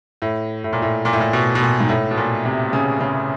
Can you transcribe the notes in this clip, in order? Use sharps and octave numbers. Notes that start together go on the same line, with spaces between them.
A2
A2
A#2
A2
A#2
A2
A#2
B2
B2
A#2
G#2
A2
B2
A#2
C3
C#3
C#3